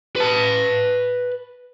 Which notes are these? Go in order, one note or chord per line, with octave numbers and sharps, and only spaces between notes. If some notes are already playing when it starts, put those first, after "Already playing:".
B4 A5